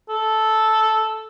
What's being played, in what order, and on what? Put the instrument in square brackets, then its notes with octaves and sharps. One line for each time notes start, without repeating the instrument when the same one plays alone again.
[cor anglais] A4